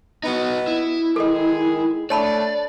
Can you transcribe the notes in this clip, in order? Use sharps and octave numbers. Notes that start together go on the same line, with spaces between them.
B3 D#4 F#4 D#5
E4
D#3 G#3 G#4 A4 D#5
A3 D4 C#5 D5 A5 B5